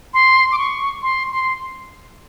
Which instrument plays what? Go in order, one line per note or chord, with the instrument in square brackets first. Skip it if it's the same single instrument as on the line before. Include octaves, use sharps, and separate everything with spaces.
[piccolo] C6
D6
C#6
C6
C6